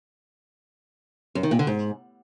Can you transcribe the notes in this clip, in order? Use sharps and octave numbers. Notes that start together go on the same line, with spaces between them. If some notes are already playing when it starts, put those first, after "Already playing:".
F#2
D#3
A#2
D3
G#2